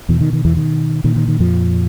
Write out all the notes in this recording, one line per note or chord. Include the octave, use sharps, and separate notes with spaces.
E2 B2 E3
D#3
D#3
E2 E3
D#3
A#2 D#3
D#3
D#3
F2 F3